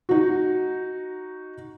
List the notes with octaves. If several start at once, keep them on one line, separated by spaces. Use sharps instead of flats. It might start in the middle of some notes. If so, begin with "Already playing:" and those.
D#4 F#4